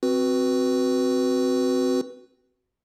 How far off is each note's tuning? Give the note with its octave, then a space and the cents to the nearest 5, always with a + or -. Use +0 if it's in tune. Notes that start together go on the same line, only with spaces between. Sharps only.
C4 +0 F#4 +0 B4 +0